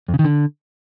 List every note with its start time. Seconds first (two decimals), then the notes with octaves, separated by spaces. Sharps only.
0.08 F2
0.14 C#3
0.19 D#3
0.24 D3